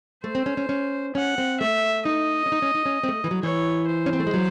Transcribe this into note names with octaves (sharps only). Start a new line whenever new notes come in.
A3 C5
C4
C#4
C#4
C#4
C#4 F#5
C4
A3 E5
D#4 D#5
C#4
D#4
C#4
D#4
C#4
C4
A3
E3
F#3
E3 C#5
C5
C#4
C4
A3
G#3
F#3